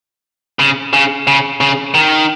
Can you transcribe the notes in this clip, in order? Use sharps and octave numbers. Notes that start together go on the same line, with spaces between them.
C#3
C#3
C#3
C#3
D#3